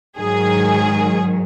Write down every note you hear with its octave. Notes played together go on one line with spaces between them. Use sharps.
G#2 D#3 F#3 G#4